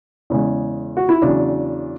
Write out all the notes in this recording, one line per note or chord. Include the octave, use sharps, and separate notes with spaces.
E2 C#3 G#3
F#4
E4
E2 C#3 F#3 D4